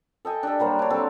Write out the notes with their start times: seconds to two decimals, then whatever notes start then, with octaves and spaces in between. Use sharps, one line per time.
0.25 A4 D#5 G5 G#5
0.43 D4 G4 A4
0.59 F#3 G3 A#3 C5
0.79 D4 C#5
0.90 F#3 C4 A4